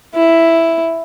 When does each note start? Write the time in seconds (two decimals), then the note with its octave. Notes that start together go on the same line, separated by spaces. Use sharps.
0.15 E4